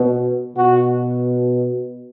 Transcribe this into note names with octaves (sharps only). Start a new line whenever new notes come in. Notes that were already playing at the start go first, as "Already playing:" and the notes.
Already playing: B2
B2 F#4